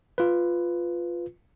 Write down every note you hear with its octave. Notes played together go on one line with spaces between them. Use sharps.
F4 B4